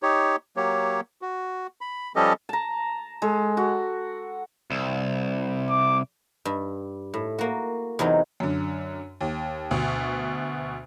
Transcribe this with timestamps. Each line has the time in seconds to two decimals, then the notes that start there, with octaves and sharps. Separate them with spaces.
0.03 D#4 G4 C#5
0.57 F#3 A#3 G4 C#5
1.22 F#4
1.81 B5
2.16 F3 G3 C#4 G4 A4 D#5
2.49 A5 A#5
3.22 G#3 A4
3.57 F#4
4.70 C2
5.69 D6
6.45 G2
7.14 A2
7.38 A#3 F#4
7.99 E2 C3 F#3 D#4
8.40 F#2 D3
9.21 D#2
9.71 D2 B2